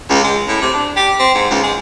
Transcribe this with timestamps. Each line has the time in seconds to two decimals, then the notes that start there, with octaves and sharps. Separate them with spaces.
0.10 C#2
0.24 G#3
0.48 A2
0.62 C3
0.74 D4
0.97 G4
1.19 C4
1.35 G#2
1.51 C#2
1.64 G#3